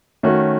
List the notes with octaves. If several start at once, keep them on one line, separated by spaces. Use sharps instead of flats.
D#3 A3 C#4 F#4